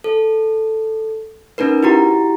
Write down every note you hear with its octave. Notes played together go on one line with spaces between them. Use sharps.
A4
C#4 D#4 A#4 B4
E4 F#4 G4 A#5